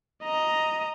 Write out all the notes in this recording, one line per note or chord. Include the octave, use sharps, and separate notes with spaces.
D#5 A#5